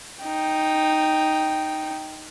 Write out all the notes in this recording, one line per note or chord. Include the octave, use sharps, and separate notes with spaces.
D#4 G5